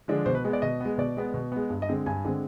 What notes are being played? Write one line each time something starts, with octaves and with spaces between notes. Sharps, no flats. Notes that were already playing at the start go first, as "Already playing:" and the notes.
D3 F3 G#3 D4
B2 C5
B4
G#3 B3
D5
B2 D#5
G#3 B3
B2 D5
G#3 B3
B2
G#3 B3
G2
D#5
D3 G#3 C4
G2 G#5
D3 G#3 C4